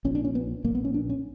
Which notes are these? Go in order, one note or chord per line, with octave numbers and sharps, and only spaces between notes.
A#1 A#2 C#4
D4
C#4
B3
A#1 A#2 A#3
B3
C#4
D4
C#4